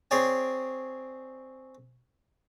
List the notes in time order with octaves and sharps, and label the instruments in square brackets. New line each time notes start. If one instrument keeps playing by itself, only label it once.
[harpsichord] C4 G#4 C#5 D5 G#5